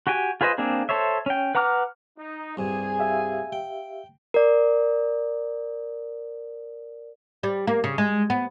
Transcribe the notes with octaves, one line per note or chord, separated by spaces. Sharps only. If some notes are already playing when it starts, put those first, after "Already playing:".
F#4 G4 G5 G#5
F4 G#4 B4 C5 D#5
A#3 C4 D4 G#4
A4 C5 C#5 E5
C#4 G5
B4 F#5 A#5 D6 F6
D#4
C2 G2 G#4 G#5
G4 E5 F5
G5
A#4 D5
G3
A#3
C#3
G#3
B3